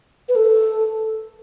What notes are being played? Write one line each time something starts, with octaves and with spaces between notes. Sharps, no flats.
B4
A4